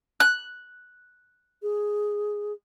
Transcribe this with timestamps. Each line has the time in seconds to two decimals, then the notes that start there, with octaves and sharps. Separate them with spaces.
0.20 F#6
1.63 G#4